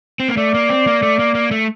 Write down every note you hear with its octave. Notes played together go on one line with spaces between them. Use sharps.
C4
A#3
A3 D5
A#3
C4
A#3
A3
A#3
A#3
A3